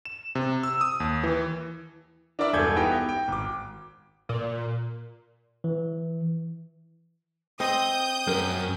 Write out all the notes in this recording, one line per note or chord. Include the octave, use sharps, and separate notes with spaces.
E7
C3
E6
D#6
D#2
E3
D4 E4 A#4 D5 E5
E1 G2 G#4 A4 G6 G#6
B3 D#4 E4 G4 D#5 G5
G5
G#1 D6
A#2
E3
C4 C5 D#5 D#6 G6
F#2 A#4